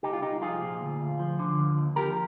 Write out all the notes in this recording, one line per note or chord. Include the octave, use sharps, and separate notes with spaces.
C2 D#4 G4
F4
C2 D#4 G4
F3 F4 G#4
A#2
D2
D2
F3
D3
D#2
D#2
F3 G4 A#4